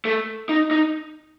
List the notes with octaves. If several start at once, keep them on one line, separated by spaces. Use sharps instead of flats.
A3
D#4
D#4